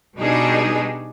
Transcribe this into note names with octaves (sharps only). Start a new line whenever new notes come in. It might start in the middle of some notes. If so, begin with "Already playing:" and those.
B2 G3 D4 D#4 G#4